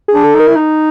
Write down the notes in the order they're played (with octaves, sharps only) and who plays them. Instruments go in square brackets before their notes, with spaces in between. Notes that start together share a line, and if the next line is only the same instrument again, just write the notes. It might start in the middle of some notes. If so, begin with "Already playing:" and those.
[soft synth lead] G#4
[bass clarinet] D4
[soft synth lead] A4
[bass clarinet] D#4
[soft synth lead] A#4
[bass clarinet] E4
D#4